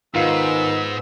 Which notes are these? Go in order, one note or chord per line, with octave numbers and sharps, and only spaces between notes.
G#2 D#3 B3 F4 E6